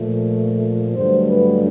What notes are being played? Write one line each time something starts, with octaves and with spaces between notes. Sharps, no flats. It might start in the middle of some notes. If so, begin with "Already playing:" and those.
Already playing: A#2 F3 A3
G2 D3 F#3 A3 C5
B4